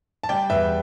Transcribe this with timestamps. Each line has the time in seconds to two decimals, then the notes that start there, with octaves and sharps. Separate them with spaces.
0.23 A5
0.29 G3 D5 G5
0.50 E2 B4 E5